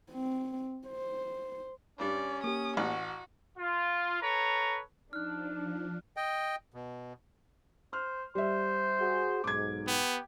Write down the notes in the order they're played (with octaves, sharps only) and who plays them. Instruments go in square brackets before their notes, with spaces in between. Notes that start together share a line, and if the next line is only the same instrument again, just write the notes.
[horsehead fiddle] C4
C5
[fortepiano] G2 G3 [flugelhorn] C#4 [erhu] D5
[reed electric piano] A#3 G4 [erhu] D#6
[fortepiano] A1 F#5 [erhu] F#4
[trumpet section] F4
A4 B4 C#5 A#5
[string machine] F3 [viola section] D4 [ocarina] D#4 [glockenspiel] F6 F#6
[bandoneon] D#5 G5
B2
[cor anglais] C5 [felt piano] F6
[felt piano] G3 E5 [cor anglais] C5
[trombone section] F#4 G#4
[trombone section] B1 G#2 [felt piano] D6 G#6
[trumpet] B3 [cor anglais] G4